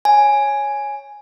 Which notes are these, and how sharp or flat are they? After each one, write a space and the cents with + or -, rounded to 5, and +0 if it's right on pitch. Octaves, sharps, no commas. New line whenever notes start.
C#5 +0 G#5 +0